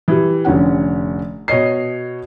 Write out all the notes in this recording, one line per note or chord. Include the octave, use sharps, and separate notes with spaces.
E3 G3
F1 D3 C#4 F#5
B2 C#5 D#5 C7